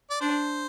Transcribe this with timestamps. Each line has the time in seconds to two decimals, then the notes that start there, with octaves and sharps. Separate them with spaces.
0.10 D5
0.21 D4 C5